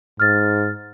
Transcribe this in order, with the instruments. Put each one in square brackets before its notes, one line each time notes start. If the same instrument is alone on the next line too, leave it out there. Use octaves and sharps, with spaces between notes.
[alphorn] G#2 [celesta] F6 A6